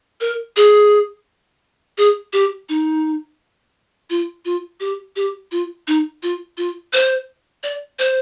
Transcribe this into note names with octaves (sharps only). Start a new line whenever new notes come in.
A#4
G#4
G#4
G4
D#4
F4
F4
G4
G4
F4
D#4
F4
F4
C5
D5
C5